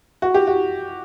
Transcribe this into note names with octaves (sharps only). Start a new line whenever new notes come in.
F#4
G4
F#4